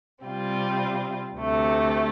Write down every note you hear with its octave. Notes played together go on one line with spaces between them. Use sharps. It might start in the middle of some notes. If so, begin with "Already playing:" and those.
C3 G3 C4 F4
D2 C3 A3